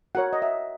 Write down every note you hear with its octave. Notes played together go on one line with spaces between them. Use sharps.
F#4 A#4 C#5 F#5
D#5
E5